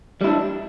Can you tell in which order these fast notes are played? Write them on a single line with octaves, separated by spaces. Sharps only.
G3 E4 D4